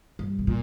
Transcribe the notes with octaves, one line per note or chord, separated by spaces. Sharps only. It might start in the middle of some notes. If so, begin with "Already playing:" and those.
G2
B2
A#2